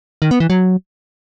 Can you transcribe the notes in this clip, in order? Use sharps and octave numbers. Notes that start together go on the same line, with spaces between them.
D#3
B3
E3
F#3